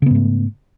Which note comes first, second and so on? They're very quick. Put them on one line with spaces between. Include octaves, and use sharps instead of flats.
C#3 B3 G#2 A3